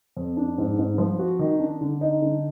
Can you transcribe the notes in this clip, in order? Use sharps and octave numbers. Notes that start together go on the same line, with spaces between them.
F2
D4
G#2
G#2
F3
F#4
D#3
D4
D3
D#4
D3